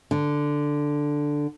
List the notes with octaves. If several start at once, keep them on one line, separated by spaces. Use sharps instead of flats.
D3